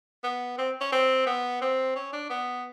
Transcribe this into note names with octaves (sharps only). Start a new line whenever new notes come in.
B3
C4
C#4
C4
B3
C4
C#4
D4
B3